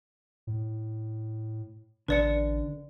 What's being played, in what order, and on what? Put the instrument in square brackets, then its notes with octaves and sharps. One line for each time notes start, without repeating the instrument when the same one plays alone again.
[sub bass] A2
[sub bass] A1 [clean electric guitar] D3 [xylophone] B4 D5 C#7